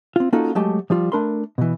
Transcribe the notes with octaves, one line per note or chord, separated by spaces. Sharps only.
C4 F4
A#3 C#4 D#4 F4 F#4 A4
F#3 G#3 A3 G4 A5
F3 G3 F4
A3 D4 A#4 B5 C6
B2 E3